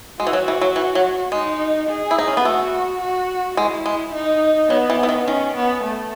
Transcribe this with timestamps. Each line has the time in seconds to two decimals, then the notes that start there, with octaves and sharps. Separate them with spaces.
0.20 G#3 F#4
0.27 E3
0.33 F#3
0.48 E3
0.61 F#3
0.76 E3
0.95 F#3
1.32 G#3 D#4
1.89 G#4
2.11 E4
2.19 D#4
2.28 C#4
2.37 B3
2.45 A3 F#4
3.02 F#4
3.57 G#3 E4
3.86 G#3
4.15 D#4
4.70 F#3 B3
4.90 E3
5.03 E3
5.09 D#3
5.27 D#3 C#4
5.56 B3
5.83 A3